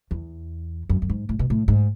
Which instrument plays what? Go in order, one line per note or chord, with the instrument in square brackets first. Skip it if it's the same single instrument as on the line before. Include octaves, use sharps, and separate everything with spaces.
[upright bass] E2
F#2
F#2
G#2
A2
B2
A2
G#2